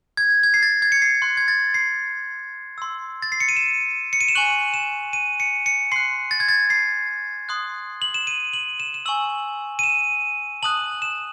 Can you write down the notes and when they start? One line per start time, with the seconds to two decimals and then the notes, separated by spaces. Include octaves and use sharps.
0.17 G#6
0.43 G#6
0.54 C7
0.63 A6
0.82 G#6
0.92 C#7
1.02 C7
1.22 C6 F#6
1.37 G#6
1.48 A6
1.74 C7
2.78 C6 E6
3.22 A6
3.32 C7
3.40 C#7
3.49 D#7
3.56 E7
4.13 C#7
4.21 D#7
4.28 E7
4.35 G#5 C#6 F#6 F#7
4.74 E7
5.13 D#7
5.40 C#7
5.66 C#7
5.92 C6 F#6 C7
6.31 A6
6.40 G#6
6.49 A6
6.70 C7
7.49 C6 D#6 F#6
8.02 F#7
8.14 E7
8.27 D#7
8.53 F#7
8.80 E7
8.94 E7
9.06 G#5 C#6 E6 F#7
9.79 D#7
9.84 E7
10.63 A5 D#6 F#6 F#7
11.02 E7